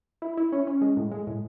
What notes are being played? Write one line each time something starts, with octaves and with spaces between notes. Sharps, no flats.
E4
E4
C#4
C#4
G#3
A2
G#3
A2